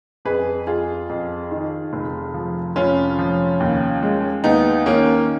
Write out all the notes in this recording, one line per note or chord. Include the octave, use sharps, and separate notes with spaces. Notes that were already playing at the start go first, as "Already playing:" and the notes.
F2 G#4 B4
F2 F4 G#4
F2
D#3
F1
F3
F1 C#4 F4
F3
D#2
G#3
D#2 B3 D#4
D#3 A#3 C#4